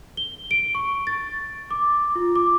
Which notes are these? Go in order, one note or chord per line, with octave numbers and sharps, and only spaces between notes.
G7
D7
C#6
A6
D6
F4
D6